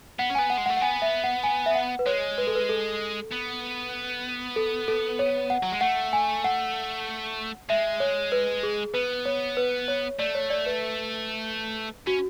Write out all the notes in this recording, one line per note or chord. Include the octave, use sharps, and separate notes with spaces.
B3 F#5
C#4
B3 G#5
F#5
G#3
F#5
A3
F#5
B3 G#5
E5
F#5
G#5
E5
F#5
B4
G#3 C#5
B4
A4
B4
A4
B3
A4
A4
C#5
F#5
F#3
G#3
A3 F#5
G#5
F#5
G#3 E5
C#5
B4
G#4
B3 B4
C#5
B4
C#5
A3 D5
C#5
D5
B4
C#4 F#4